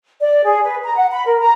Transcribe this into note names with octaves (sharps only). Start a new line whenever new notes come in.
D5
G#4
B4
A#5
F#5
B5
A#4
A#5